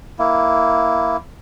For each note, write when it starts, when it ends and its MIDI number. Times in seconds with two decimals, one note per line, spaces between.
0.19 1.17 58
0.19 1.17 64